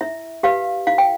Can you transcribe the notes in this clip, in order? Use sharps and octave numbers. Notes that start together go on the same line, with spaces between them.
E4 E5
G4 B4 F5
E4 F5
G5